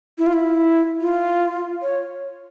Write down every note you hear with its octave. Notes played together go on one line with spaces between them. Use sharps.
E4
F4
E4
F4
C#5